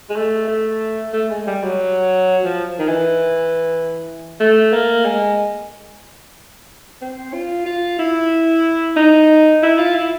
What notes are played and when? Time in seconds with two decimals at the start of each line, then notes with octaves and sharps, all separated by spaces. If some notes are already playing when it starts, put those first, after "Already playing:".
0.10 G#3
0.16 A3
0.48 A3
1.13 A3
1.30 G#3
1.47 G3
1.63 F#3
2.45 F3
2.79 D#3
2.88 E3
4.40 A3
4.73 A#3
5.05 G#3
7.02 C4
7.33 F4
7.66 F4
7.99 E4
8.96 D#4
9.63 E4
9.79 F4
9.95 E4